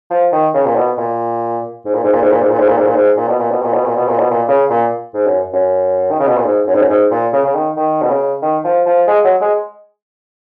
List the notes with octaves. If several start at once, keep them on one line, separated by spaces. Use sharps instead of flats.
F3
D#3
C#3
A#2
B2
A#2
G#2
A#2
G#2
A#2
G#2
A#2
G#2
A#2
G#2
A#2
G#2
A#2
G#2
A#2
B2
A#2
B2
A#2
B2
A#2
B2
A#2
B2
A#2
C#3
A#2
G#2
F#2
F#2
D#3
C#3
B2
A#2
G#2
F#2
G#2
F#2
G#2
A#2
C#3
C#3
D#3
D#3
B2
C#3
D#3
F3
F3
G#3
F#3
G#3